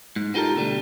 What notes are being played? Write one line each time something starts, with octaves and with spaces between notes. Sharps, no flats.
G#2
B3 D#4 F4 G4 A4 A#4
B2 D3 G3 A3